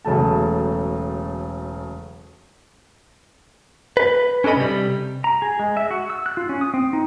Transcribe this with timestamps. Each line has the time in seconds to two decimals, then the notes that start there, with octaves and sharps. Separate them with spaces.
0.05 E1 C#3 F#3 A3 A5
3.97 B4
4.44 C#4 D4 A4 D#5 B5
4.57 C3 G3
5.24 A#5
5.42 G#4
5.59 G#3
5.77 E5
5.91 F#4
6.10 E6
6.26 F#6
6.37 F4
6.49 C#4
6.61 D#6
6.74 C4
6.93 D#4